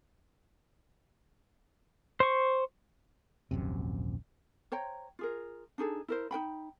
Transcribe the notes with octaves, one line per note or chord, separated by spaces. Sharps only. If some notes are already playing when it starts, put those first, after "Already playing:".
C5 C#6
D#1 A#1 F#2 C3
C5 C#5 G5 A#5
F4 G#4 A#4
D4 D#4 G#4 A4
E4 A#4 C5
D#4 B4 G5 B5